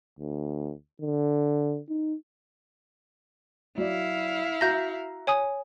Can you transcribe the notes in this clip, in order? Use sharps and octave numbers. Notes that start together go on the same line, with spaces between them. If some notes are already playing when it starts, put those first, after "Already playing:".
D2
D3
D#4
F#3 E4 D5 F5
F#4 E5 A#5 G6 A#6
C#5 G#5 D#6